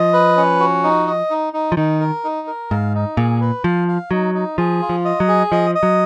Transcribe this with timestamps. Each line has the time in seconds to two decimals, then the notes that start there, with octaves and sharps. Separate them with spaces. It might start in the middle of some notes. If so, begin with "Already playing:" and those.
Already playing: F3 D#5
0.13 B4
0.37 C#4
0.60 F#4
0.83 D#4
1.07 D#5
1.30 D#4
1.53 D#4
1.72 F3
1.77 D#3 D#4
2.00 A#4
2.24 D#4
2.47 A#4
2.71 G#2 F5
2.95 D#4
3.17 A#2 G#4
3.41 B4
3.64 F3 F5
3.88 F5
4.11 F#3 D#4
4.35 D#4
4.58 F3 G#4
4.82 F4
4.89 F3
5.05 D#5
5.20 F#3
5.28 G#4
5.52 F3 D#5
5.75 D#5
5.83 F#3